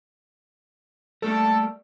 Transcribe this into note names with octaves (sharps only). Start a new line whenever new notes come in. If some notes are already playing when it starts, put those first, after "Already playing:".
G3 A3 A#3 A4